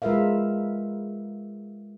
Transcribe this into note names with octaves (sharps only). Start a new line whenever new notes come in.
G#3 F4 A#4 B4 E5 F5